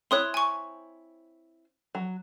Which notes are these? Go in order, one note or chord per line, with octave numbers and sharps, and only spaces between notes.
C4 E4 C#5 C6 D#6 F#6
G#5 C#6
F#3